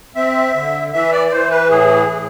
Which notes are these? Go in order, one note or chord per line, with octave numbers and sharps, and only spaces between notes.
C4 E5
D3
E3 E5
D5
D5
E3 C5
B4
A2 G#4
A2